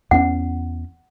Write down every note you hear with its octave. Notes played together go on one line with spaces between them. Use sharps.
E2 B3 C#4 F#5